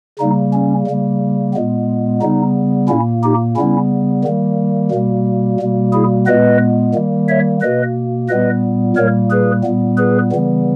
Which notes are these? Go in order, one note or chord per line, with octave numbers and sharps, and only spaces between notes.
C#3 G3 A#3 D#4
C#4
C#3 G3 A#3
A#2 G#3 B3
C#3 G3 B3 D#4
A#2 A#3 C#4 E4
D#4 G4
C#3 G3 B3 C#4 E4
D#3 G3 A#3
B2 G3 A#3
B2 G3 A#3
E4 G#4
A#2 G#3 B3 B4 D#5
D#3 G3 A#3
C#5 E5
B2 A#3 B4 D#5
A#2 G3 B3 B4 D#5
A#2 G3 A#3 A#4 C#5
G#4 B4
A#2 G3 B3
G#4 B4
C#3 E3 G3 B3